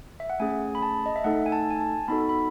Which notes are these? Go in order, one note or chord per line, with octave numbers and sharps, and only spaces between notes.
E5
F#5
A3 C#4 G#4 G#5
B5
A5
D#5
E5
A3 D#4 A4 F#5
G#5
A5
G#5
A5
B3 D#4 F#4 A4 B5
B5